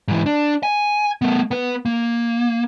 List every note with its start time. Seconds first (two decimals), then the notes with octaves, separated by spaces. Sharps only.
0.08 G#2 E3
0.26 D4
0.63 G#5
1.22 A3 B3
1.51 B3 B4
1.85 A#3